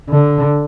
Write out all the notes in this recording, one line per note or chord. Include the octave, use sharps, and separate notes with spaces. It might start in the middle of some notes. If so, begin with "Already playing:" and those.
D3